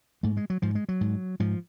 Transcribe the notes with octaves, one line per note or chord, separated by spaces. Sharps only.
G#2 A3
G#3
F#3
G#2 F3
G#3
F#3
G#2
G#2 F3